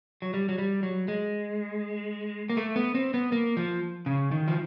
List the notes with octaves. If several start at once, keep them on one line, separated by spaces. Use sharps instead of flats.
F#3
G3
F#3
G3
F#3
G#3
A#3
A3
B3
C4
B3
A#3
F3
C#3
D#3
F3